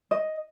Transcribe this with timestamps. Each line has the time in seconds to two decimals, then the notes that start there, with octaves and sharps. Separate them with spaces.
0.11 D#5